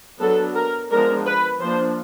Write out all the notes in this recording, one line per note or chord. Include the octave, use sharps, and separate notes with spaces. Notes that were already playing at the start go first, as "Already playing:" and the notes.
F#3 B3 D4 A4
A#4
F3 G#3 B3 D4 A#4
B4
F3 A#3 D4 C5